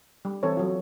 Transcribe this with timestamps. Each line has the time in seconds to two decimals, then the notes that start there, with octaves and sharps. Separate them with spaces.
0.25 G3
0.43 E3 C4 A4 C5 C#5
0.57 F#3 F4